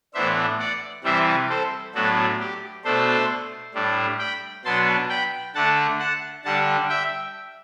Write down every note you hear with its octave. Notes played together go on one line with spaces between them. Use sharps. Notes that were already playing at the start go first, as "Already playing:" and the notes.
A2 E3 B3 D4 C5 E5
D5 F#5
C3 E3 G3 C5 E5
A4 C5
A2 F#3 B3 D4 F#4 A4
G4
B2 A3 D4 A4 C5
A2 G3 D4
G5 B5
B2 F#3 B3 D4 A5 C6
G5 B5
D3 A3 D4 F#5 A5
F#5 A5
D3 G3 D4 F#5 A5
E5 G5